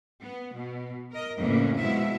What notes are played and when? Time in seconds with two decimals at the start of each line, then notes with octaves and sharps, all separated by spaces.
0.21 B3
0.54 B2
1.11 A#4 D#5
1.40 F2 A2 C#3 E3 A#3 C#4
1.77 B2 F3 G#3 E4 E5